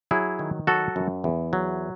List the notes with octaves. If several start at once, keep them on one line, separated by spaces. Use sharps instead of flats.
F#3 E4 G#4
D#3
F#3 F#4 A4
F#2
E2
F#3